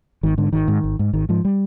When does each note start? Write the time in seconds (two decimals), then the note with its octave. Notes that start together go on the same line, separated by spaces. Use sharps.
0.23 G#1 D#3
0.38 G#2 D3
0.53 G#1 D#3
0.68 G#2
0.84 G#1
0.99 G#2
1.13 G#1 D#3
1.29 G#2 F3
1.45 G3